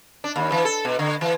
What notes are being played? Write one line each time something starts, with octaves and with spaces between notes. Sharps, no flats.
D4
D#2
E3
A4
B2
D3
E3